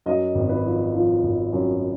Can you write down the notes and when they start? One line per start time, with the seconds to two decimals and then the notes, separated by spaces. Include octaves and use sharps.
0.06 F#2 D#5
0.35 G#1
0.49 B4
0.65 F3
0.94 F3
1.23 G#1
1.53 F#2